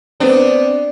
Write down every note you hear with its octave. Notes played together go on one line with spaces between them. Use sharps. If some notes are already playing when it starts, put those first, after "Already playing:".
B3 C4 D4